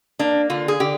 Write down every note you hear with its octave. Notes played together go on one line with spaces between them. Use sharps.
A#3 D4
D3 F4
G#4
D3 G4